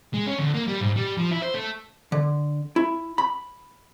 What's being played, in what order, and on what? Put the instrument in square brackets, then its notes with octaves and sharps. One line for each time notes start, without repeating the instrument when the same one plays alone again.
[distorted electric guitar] G#3
C#4
D2
A#3
G3
G#2
G3
F3
E4
C5
A3
[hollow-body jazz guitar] D3
E4
B5